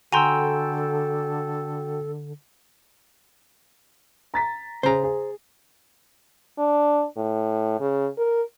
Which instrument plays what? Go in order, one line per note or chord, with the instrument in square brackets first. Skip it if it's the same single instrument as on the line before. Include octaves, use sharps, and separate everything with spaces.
[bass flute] D3 [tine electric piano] F#4 G5 E6 [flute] A4 [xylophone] G#5 A#5 C6
[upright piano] A#5 A6 B6
[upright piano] C#3 G#4 [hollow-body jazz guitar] C5 A#5
[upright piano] G#4
[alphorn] D4
A2
C#3
A#4